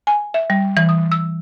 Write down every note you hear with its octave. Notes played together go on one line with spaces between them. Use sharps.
G#5
E5
G3
E3
D#6
E6